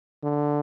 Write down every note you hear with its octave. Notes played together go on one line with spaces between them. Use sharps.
D3